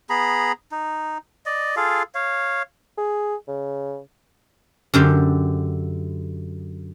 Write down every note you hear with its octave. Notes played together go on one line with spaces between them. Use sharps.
B3 G#4 A#5 B5
D#4
D5 D#5
F4 G#4 A4 F5
C#5 F5
G#4
C#3
F#2 D3 G4 C5